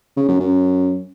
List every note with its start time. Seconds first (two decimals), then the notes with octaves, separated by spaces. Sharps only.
0.17 C#3
0.28 F#2
0.40 F#2